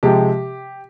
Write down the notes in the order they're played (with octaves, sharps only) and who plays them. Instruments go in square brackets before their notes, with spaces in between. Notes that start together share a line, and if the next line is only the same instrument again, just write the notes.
[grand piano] C3 F3 G#3 G4